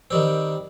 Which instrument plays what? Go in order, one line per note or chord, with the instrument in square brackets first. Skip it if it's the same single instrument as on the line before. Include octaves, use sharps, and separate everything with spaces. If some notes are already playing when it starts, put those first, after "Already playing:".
[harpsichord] D#3 G3 C4